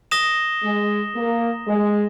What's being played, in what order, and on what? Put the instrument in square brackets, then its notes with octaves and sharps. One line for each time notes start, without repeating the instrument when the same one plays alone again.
[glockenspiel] D#6 A#6 E7 G7
[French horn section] G#3
A#3
G#3